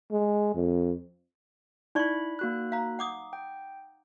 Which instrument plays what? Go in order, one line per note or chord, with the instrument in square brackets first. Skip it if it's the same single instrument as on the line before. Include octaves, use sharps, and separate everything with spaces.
[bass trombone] G#3
F2
[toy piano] D#4 D5 C#6 [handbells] E4 B5
[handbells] A#3 F#4 F#6
[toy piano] F5 A#5
F#5 D6 D#6
[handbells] G5